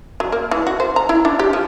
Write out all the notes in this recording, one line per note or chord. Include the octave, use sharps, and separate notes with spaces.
F#3
A#3
E3
F#4
C5
A#5
E4
D4
G4
F3